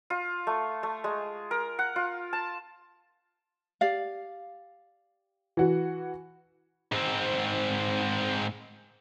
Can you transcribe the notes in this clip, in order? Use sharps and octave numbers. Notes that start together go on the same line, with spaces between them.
F4
A3
A3
G#3
A#4
F#5
F4
A5
G4 D5 F5
E3 F#4
G#2 C4